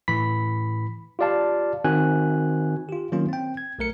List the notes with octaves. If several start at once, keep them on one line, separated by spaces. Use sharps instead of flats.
A2 E3 B5 B6
F4 G4 D5 F5 A5
D#3 C4 F#4 G#5 F#6
F4 G4
D#3 F#3 A#3 C4 C#4 F4
C4 G5
G#6
B1 A3 A#4 C#7